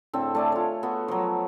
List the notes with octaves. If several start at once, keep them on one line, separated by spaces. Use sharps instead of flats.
A2 D3 C4 A4
A3 D5 G#5
F4 C#5
B3 F#4 A4
F3 F#3